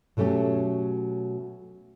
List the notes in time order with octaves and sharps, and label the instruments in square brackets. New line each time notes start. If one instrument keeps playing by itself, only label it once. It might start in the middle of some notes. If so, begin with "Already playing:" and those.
[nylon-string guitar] B2 F#3 A3 C#4 G4